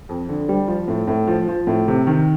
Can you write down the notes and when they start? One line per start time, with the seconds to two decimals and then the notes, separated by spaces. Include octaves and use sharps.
0.09 F2
0.29 D3
0.49 G3
0.68 F3
0.88 A2
1.08 A2
1.27 F3
1.48 F3
1.67 A2
1.88 C3
2.07 D#3